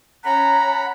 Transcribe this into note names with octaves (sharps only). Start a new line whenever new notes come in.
C#4 F#5 A#5 B5